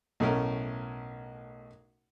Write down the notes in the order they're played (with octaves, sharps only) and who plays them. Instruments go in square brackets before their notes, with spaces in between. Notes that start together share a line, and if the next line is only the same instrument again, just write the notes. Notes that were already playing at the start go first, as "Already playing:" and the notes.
[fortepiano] B1 A2 A3 C#4 A#4